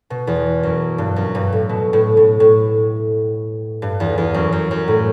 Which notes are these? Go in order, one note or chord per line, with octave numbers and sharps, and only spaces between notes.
B2
E2
F#2
G2
F#2
G2
A2
B2
A2
A2
A2
G2
E2
E2
F#2
F#2
F#2
A2